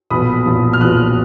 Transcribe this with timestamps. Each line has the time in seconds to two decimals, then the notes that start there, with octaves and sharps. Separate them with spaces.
0.10 B1 A#2 F3 B3 B5 D#6
0.46 B1 A#2 F3 B3
0.73 F6
0.81 B1 A#2 F3 B3 D#6 F#6